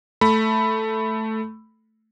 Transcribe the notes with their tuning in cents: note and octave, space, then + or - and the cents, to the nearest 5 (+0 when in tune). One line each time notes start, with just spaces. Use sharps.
A3 +0 B5 +5